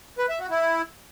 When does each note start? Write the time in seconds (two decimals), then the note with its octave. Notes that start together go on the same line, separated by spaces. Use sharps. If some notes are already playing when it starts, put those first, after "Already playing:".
0.18 B4
0.29 E5
0.40 F#4
0.50 E4